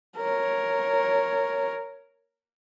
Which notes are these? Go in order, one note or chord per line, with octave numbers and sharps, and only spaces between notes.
A#4 C#5